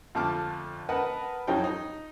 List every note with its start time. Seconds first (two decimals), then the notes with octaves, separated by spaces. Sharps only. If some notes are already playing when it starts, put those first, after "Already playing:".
0.15 F2 D3 A3 A5 D6 F6
0.89 A#4 B4 D#5 F#5 A5 B5
1.47 F2 E3 F#3 D#4 A4 G5
1.64 D#4